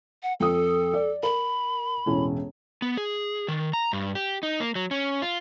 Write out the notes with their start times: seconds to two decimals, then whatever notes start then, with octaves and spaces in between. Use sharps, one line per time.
0.23 F#5
0.40 F2 A4 D#6
0.93 D5
1.23 A#4 B5
2.06 E1 A2 C#4
2.82 B3
2.97 G#4
3.48 D#3
3.73 A#5
3.93 G2
4.15 G4
4.43 D#4
4.60 A#3
4.75 F#3
4.91 C#4
5.22 F4